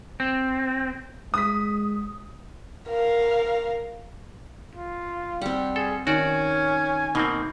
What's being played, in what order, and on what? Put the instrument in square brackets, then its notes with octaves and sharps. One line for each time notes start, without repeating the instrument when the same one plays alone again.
[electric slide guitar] C4
[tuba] G#3 [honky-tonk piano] D#6 B6
[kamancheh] A#4 F5
[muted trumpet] F4
[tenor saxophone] G3 [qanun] C4 F#5
[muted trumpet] G#4 [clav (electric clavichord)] A4
[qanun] D#3 [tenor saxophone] C#4 [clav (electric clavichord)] F#4 D5 [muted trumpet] G#5
[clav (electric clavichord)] B2 A#3 C4 [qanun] D#4